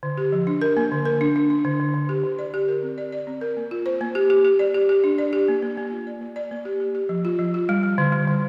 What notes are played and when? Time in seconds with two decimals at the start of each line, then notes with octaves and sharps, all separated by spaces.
0.03 D3
0.18 G4
0.32 F3
0.47 D4
0.61 A#4
0.77 A#3
0.92 D3
1.05 A#4
1.21 D4
1.36 D4
1.50 D4
1.65 D3
1.80 D3
1.94 D3
2.09 G4
2.24 D3
2.39 D5
2.54 G4
2.68 A#4
2.83 C4
2.98 D5
3.12 D5
3.27 C4
3.41 A#4
3.57 A#3
3.71 F4
3.86 C5
4.01 A#3
4.15 G4
4.30 G4
4.45 G4
4.59 D5
4.74 G4
4.89 G4
5.04 D4
5.18 D5
5.33 G4
5.48 A#3
5.62 A#3
5.77 A#3
5.92 F4
6.07 D5
6.21 A#3
6.36 D5
6.51 A#3
6.65 G4
6.80 G4
6.95 G4
7.09 F3
7.25 F4
7.39 F3
7.54 F4
7.69 G3
7.83 G3
7.98 D3
8.12 G3
8.28 D3